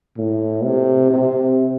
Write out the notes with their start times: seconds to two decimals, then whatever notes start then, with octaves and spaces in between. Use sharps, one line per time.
0.17 A2
0.64 C3
1.11 C3